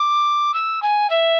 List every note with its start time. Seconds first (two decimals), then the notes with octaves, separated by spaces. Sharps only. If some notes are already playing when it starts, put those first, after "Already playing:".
Already playing: D6
0.53 E6
0.82 G#5
1.09 E5